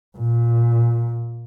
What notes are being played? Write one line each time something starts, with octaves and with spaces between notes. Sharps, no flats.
A#2